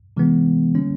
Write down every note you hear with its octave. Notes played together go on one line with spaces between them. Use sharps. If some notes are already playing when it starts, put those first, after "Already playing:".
C3 E3 G#3 B3
D3 G3 A#3 C#4